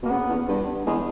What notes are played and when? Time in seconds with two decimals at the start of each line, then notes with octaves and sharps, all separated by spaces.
0.03 B2 A#3
0.10 C#3 B3
0.29 E2
0.48 G2
0.86 E2 G#3